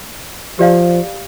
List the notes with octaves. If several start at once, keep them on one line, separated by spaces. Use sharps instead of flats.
F3 G4 D5 F5